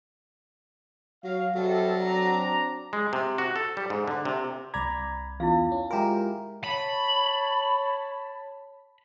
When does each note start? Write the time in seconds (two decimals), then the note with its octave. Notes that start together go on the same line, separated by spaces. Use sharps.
1.24 F#3 C#5 F5
1.55 C3 F#3 G3 A4
2.02 C4 D4 A#5
2.93 G#3
3.13 C3
3.38 F#4
3.56 A4
3.77 G3
3.90 G#2
4.08 D3
4.25 C3
4.74 C2 D5 A#5 B5 G#6
5.40 E2 E4 F4 F5
5.72 C#4
5.91 G#3 E4 F4 G4 A#4 G#5 A#5
6.64 C#5 A5 B5